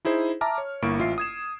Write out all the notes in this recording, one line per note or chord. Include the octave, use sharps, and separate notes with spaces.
D#4 E4 G#4 C5
E5 A5 A#5 D6 F6
C#5
G1 A#3 E4 C#6 D7
A1 F4 E5 C7
D#6 G#6 E7